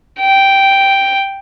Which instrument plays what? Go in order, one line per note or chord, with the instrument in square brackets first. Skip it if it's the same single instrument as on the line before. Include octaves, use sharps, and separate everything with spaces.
[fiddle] G5